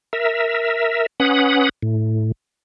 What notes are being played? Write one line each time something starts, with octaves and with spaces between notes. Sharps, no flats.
A#4 E5
C#4 B4 F#5 D#6
A2